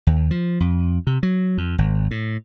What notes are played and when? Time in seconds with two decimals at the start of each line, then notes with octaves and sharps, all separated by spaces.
0.07 D#2
0.31 F3
0.60 F2
1.07 C3
1.23 F#3
1.58 F2
1.78 G#1
2.11 A2